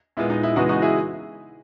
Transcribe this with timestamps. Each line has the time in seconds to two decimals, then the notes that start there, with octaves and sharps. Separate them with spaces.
0.17 A#2 G#3 B3 E4
0.30 D#4
0.43 E4
0.56 C#3 E3 G#3 B3 D#4 F#4
0.69 D#4 F#4
0.82 E4 G#4